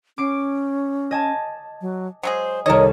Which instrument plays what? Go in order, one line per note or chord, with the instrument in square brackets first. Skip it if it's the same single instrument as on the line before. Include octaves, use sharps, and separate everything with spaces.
[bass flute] C#4 [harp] D6 C7 D7
[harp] D#5 G#5 A5
[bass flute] F#3
[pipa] F#3 G#3 G#4 [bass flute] C5
[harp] C2 A4 C#5 [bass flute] D#3 [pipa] A#4 D#5